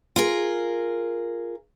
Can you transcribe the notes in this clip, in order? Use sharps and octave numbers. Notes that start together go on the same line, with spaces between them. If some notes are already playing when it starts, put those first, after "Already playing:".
F4 G#4 A#4